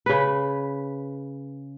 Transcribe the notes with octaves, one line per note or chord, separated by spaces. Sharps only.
C#3 B4